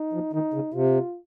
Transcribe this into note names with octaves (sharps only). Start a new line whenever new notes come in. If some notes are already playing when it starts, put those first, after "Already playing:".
Already playing: D#4
F3
D#3 D#4
C#3
C3 F4